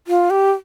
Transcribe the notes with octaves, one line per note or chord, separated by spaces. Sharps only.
F4
G4